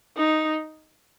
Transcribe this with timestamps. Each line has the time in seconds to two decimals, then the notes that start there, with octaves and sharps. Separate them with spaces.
0.17 D#4